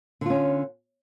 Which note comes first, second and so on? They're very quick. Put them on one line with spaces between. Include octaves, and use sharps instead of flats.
D3 F4 C#4